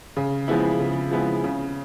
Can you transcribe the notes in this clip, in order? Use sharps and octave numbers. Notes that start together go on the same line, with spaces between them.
C#3
F3 G#3 B3 E4
C#3
F3 G#3 B3 E4
C#3